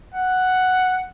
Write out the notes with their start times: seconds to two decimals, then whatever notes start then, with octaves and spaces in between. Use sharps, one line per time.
0.14 F#5